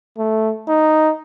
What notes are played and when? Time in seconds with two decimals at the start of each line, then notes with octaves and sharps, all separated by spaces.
0.18 A3
0.68 D#4